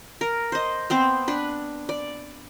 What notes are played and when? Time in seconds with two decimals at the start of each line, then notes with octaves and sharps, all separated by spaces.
0.21 A#4
0.52 C5 D#5
0.90 B3 C4 C5
1.28 D4 B4
1.89 D5